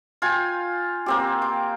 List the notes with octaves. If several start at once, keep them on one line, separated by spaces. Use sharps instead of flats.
F4 G5 G#5
A#3 C4 G4
D6